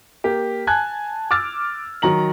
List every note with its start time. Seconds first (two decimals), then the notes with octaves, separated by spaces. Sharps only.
0.24 A#3 G4
0.67 G#5 A5 F#6 G#6
1.31 D6 E6 F6 A6
2.02 D#3 F#3 A#5 F#7